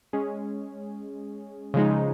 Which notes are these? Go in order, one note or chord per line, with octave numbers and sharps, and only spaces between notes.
G#3 C#4 G#4
C#3 F3 G#3 D#4